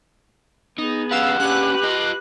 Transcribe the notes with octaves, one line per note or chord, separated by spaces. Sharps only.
B3 D#4 G#4
C#4 G4 B4 F5 F#5 E6
A#3 C#4 D4 G4 B4 F#6
F4 D#5